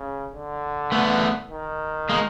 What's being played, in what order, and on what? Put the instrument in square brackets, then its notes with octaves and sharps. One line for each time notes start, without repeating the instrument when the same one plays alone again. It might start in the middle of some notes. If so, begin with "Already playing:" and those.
Already playing: [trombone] C#3
D3
[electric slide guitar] A3 B3
[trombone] D#3
[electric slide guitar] G#3 A#3